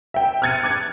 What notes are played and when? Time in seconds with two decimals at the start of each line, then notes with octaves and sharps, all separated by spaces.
0.14 E5 G5
0.42 F6 F#6 G#6 A6 C#7 D#7
0.63 D6 F#6 G#6